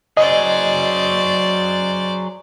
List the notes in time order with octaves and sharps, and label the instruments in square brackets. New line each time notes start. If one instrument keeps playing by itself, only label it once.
[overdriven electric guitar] F#3 G#4 [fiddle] C5 D5 [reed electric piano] D#5